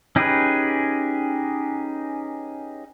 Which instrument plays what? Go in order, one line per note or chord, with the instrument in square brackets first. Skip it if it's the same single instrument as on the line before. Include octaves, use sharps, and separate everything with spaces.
[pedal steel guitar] C#4 D#4 G4 G#4 B4